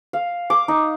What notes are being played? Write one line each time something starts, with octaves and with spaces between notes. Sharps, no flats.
F5
D6
D#4